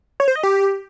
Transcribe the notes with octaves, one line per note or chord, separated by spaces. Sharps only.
C#5
C5
D#5
G4